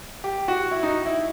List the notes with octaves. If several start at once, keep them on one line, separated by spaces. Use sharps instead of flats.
G4
F#4
E4
D#4
E4